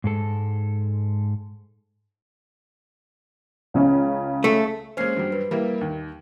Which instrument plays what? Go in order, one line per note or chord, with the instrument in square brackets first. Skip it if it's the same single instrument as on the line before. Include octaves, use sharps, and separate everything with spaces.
[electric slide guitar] G#2 G#3 A4
[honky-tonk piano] C#2 C#3 C#4
[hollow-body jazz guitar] A3
[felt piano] G#3 A#3 C#4 [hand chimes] C5 F6 C7
[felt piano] G2 F#3 G3
[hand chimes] B4
[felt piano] G3 A#3 E4 [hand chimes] A#4
[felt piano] D#2